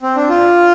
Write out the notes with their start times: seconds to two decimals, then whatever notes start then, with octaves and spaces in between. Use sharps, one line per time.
0.03 C4
0.16 D4
0.29 F4